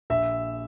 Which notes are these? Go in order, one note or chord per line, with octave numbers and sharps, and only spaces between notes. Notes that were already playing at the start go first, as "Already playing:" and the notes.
A#1 E5